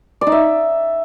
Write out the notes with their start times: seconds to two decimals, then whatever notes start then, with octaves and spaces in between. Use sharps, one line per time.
0.21 D5
0.27 D#4
0.32 E5